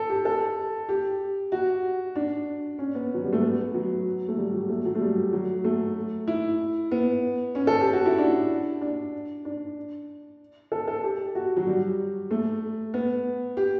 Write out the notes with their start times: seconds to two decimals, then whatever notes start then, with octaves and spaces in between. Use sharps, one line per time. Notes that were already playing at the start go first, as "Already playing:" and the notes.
Already playing: A4
0.09 G4
0.25 A4
0.89 G4
1.52 F#4
2.16 D4
2.79 C#4
2.95 B3
3.14 F#3
3.24 G3
3.33 A3
3.42 B3
3.74 F#3
4.28 A3
4.37 G3
4.53 F#3
4.69 A3
4.85 F#3
4.95 A3
5.01 G3
5.33 F#3
5.64 A3
6.27 E4
6.91 B3
7.55 C#4
7.67 A4
7.80 G4
7.93 F#4
8.06 E4
8.18 D4
8.81 D4
9.45 D4
10.72 A4
10.88 A4
11.04 G4
11.35 F#4
11.57 F#3
11.67 G3
12.31 A3
12.94 B3
13.57 G4